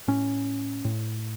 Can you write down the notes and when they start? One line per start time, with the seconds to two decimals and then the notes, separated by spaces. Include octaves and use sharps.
0.08 A2 C#4
0.85 A2